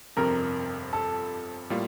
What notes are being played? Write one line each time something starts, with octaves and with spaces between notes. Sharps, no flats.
G1 F2 C3 F3 C4 A#4
A4
A2 G3 A#3 F4